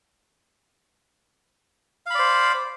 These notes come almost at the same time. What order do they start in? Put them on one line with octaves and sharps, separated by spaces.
F5 B5 D5 C5